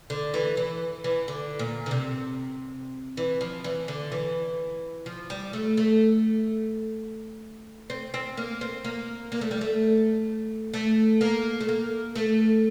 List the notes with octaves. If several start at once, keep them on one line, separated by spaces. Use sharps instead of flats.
D3
E3
E3
E3
D3
A#2
D3
C3
E3
F3
E3
D3
E3
F3
G3
A3
A3
C4
C4
A#3
C4
A#3
A#3
A3
G3
A3
A3
A#3
A3
A#3
A3